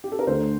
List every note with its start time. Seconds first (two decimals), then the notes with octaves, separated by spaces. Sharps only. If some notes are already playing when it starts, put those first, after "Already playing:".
0.04 G4
0.12 A4
0.19 A#4
0.27 D2 D3 A3 C5